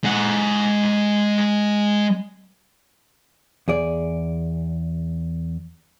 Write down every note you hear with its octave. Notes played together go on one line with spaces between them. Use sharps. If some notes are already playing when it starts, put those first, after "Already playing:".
G#3 F#5
E2 G#4 D5